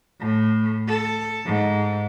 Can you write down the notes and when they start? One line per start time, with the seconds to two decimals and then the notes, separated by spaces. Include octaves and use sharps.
0.20 A2
0.88 A4
1.45 G#2